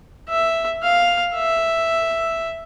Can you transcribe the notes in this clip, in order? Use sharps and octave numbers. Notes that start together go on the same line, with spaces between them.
E5
F5
E5